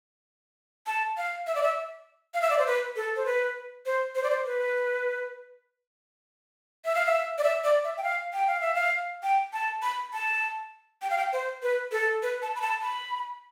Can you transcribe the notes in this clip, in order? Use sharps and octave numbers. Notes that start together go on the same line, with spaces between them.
A5
F5
E5
D5
E5
F5
E5
D5
C5
B4
A4
C5
B4
C5
C5
D5
C5
B4
E5
F5
E5
D5
E5
D5
E5
G5
F5
G5
F5
E5
F5
G5
A5
B5
A5
G5
F5
G5
C5
B4
A4
B4
A5
B5
A5
B5